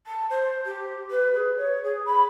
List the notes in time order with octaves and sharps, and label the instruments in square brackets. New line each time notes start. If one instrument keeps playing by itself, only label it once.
[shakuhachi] A5
C5
G4
B4
G#4
C#5
G#4
B5